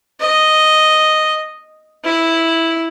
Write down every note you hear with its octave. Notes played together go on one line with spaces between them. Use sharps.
D#5
E4